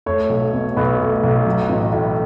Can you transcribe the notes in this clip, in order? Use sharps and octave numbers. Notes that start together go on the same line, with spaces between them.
A3 C#5
B1
B2
B1 B4
A3
B1
F#3
A1
A2